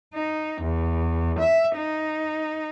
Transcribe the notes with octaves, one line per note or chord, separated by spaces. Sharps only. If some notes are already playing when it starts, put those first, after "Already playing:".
D#4
E2
E5
D#4